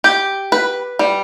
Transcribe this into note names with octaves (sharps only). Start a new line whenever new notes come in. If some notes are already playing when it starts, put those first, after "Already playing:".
G4
B4
G3